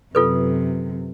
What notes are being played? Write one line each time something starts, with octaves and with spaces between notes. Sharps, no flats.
F#2 C3 F4 A4 B4